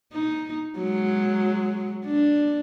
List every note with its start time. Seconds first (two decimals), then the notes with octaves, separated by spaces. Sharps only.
0.13 D#4
0.78 F#3 G#3
2.05 D4